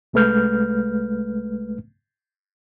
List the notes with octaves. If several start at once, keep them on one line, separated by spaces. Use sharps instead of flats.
C2 G#3 A3 B4 F6 G6